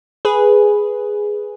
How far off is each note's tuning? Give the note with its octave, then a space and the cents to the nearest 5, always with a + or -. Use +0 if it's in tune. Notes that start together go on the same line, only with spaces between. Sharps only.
G#4 +0 B4 +0